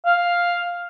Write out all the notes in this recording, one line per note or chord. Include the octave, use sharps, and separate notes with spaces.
F5